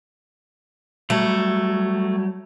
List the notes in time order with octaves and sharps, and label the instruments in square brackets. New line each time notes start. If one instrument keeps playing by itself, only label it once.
[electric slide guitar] F#3 G3 [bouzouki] A3